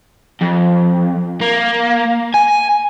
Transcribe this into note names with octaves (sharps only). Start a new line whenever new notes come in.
F2
A#3
G#5